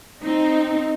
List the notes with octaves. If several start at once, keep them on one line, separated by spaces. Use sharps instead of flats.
C4 D#4